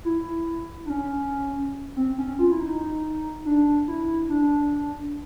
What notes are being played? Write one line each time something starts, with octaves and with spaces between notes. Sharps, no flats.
E4
D4
C#4
C4
C#4
F4
E4
D#4
D4
E4
D4